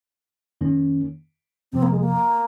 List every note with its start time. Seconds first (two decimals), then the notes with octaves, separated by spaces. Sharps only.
0.61 F2 D#3 A#3 C#4
1.73 F2 C3 F3 C4
1.83 A#3
1.91 G#3
2.00 A#3